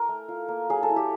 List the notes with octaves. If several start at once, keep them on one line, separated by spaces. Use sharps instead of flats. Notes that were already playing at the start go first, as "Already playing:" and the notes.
Already playing: A#4
A3
F4
A#3
F#3 G#4
A4
E4
G4